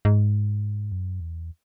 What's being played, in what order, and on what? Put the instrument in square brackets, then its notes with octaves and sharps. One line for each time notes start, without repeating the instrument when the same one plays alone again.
[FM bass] G#2
F#2
E2